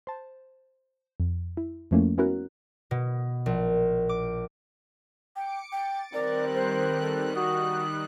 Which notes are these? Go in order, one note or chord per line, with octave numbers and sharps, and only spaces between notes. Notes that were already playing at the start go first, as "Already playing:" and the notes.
C5 A5
F2
E4
F2 F3 A3 A#3 C#4 E4
B3 C#4 E4 F#4 A#4 F#6
B2
A#1
D6
G5 D6 C#7 D7
G5 A6
D#3 G3 C4 A#4 D5 F#6
C5
A4
F#4 D#6